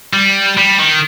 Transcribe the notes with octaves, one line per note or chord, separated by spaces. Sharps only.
G3
G3
D#3